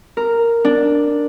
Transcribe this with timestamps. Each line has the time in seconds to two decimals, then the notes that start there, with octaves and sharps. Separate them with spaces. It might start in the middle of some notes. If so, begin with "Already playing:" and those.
0.17 A#4
0.65 D4